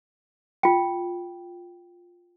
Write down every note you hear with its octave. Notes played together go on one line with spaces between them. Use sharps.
F4 G5